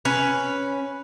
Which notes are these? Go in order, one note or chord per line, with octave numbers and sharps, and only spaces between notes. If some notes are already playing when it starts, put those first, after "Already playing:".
C#4 B4